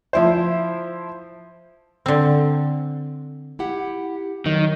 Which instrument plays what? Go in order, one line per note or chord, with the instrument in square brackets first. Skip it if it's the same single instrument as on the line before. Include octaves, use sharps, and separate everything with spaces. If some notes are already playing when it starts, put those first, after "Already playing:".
[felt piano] F3 E4 C5
[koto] D3 C4
[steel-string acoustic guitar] E4 G4 F#5
[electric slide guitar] D#3 [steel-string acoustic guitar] F#3